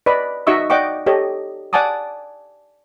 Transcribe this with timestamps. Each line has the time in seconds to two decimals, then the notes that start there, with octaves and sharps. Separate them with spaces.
0.06 B4 D5 D#5 B5
0.47 D#4 F#4 D#5 E5 C#6 E6
0.70 D5 D#5 F#5 G5 C#6 D6
1.06 G4 A4 C#5 D#5
1.73 D5 F#5 G#5 A5 D6 D#6